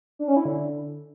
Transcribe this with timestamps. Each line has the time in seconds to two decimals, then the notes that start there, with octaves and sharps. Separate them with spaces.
0.19 D4
0.28 C#4
0.37 E4
0.45 D3